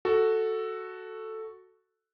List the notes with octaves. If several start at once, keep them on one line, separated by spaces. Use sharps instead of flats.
F#4 A4